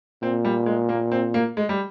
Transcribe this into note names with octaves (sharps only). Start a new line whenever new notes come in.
A#2 C4
G3
G#3
A#3
C4
A#3
G#3
G3